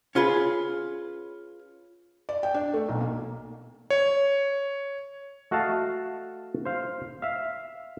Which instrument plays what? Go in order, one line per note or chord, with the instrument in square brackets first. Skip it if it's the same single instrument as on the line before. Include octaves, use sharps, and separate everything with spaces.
[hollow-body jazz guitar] C#4 F4 G#4 B4
[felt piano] D5
G5
D4
A3
B1
A#3
[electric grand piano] C#5
[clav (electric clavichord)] A3 F#4 D#5 F5 A5
C5 F5
E5 F5